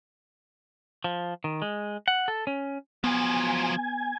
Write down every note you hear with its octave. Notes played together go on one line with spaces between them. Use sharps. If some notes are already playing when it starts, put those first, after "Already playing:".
F3
D#3
G#3
F#5
A4
C#4
F3 F#3 B3 G#5